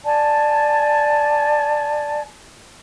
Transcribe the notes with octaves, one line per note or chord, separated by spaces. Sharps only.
D5 G#5 A5